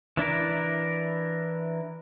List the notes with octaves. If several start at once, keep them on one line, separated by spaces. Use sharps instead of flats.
E3 D4 E4 A#4